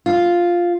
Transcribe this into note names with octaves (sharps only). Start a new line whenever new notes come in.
F4